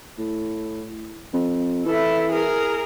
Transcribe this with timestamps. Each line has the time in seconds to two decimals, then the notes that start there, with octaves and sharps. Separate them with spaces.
0.19 A2
1.34 F2
1.86 E3 E4 A4
2.32 G#4 A#4